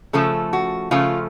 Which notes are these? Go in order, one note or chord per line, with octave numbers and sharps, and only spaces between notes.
C#3 F3 A3 A4
F#4
C#3 F3 A3 F4